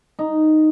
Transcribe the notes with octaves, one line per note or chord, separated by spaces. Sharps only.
D#4